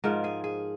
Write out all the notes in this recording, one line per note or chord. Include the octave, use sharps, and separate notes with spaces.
G#2 F3 A#4
G#4
G#4